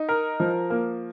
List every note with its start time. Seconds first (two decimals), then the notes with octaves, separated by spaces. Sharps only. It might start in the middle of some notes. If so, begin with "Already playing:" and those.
Already playing: D#4
0.09 A#4
0.40 F3
0.70 A#3